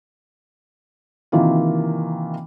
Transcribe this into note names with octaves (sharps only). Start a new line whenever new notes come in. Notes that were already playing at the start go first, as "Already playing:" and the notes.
C3 D#3 E3 A#3 F4